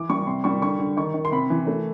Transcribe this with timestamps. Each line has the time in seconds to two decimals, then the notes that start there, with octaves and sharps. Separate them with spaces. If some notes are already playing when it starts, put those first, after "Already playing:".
Already playing: E3 D6
0.10 G3 C#6
0.26 C3 C6
0.44 G3 C#6
0.61 D3 C#6
0.79 D3
0.97 D#3 C#6
1.14 D#3
1.25 C6
1.32 C3 B5
1.50 E3
1.67 A3